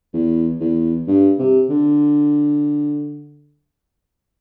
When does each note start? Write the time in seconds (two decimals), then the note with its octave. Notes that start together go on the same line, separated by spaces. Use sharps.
0.13 E2
0.60 E2
1.08 G2
1.39 C3
1.70 D3